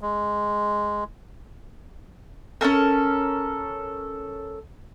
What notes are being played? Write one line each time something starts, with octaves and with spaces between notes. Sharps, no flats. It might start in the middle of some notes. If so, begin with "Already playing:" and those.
G#3
C#4 D#4 A4 A#4